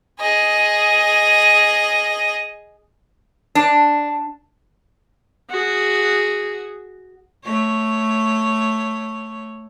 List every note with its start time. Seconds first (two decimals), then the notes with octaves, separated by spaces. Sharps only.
0.20 G#4 D#5
3.55 D4
5.50 F#4 G#4
7.45 A3 C#5